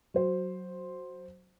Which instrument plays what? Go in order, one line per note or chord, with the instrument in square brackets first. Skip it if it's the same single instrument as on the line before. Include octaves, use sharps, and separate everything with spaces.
[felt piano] F#3 C5